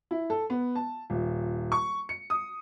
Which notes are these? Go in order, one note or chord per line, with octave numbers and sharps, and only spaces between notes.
E4
A4
B3
A5
D#1
C#6
C#7
D#6